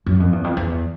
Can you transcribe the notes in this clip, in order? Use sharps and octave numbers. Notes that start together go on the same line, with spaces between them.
F#2
F2
E2
F2
E2